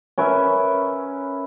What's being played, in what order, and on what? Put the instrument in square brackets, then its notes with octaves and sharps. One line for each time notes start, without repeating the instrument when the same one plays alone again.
[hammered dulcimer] C#4 A#4 B4 E5